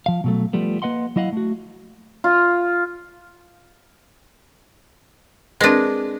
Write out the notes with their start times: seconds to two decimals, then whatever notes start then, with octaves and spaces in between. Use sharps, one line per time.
0.06 F3 F5
0.24 B2 F#3 A3
0.53 F3 G3 A3 B3
0.82 A#3 B4 D#5 F#5 C6
1.16 F#3 E4 D#5 F5 F#5
1.32 A3 F#4
2.24 F4
5.61 G#3 C4 D4 A#4 B4